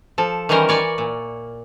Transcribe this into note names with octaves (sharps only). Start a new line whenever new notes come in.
F3 A4
D#3 E3 G3 C#4 A#4 C5
C#5 D5 G#5
A#2